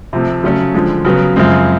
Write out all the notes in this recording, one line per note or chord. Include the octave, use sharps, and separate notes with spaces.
C3 F3 A3
C#3 F#3 A3 C#4
D3 F3 G#3
C#3 F#3 B3
F#2 C#3 F3 G#3 C4